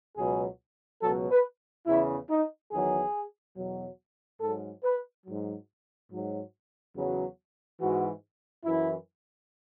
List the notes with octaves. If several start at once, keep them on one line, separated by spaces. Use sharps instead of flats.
C#2 B2 F#3 G#4
C#2 B2 F#3 A4
B4
E2 C#3 E3 E4
D#4
E2 D#3 F#3 G#4
E2 B2 F#3
G#2 F#3 A4
B4
G#2 F#3
G#2 F#3
E2 C#3 F#3
G#2 E3 F#4
F#2 E3 E4